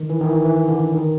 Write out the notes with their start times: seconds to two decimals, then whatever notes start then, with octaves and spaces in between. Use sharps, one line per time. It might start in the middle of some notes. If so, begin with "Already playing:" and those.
Already playing: D#3
0.10 E3
0.21 D#3
0.26 E3
0.44 E3
0.68 D3
0.94 D#3